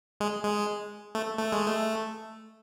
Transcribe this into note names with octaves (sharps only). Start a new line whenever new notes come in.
G#3
G#3
A3
A3
G#3
A3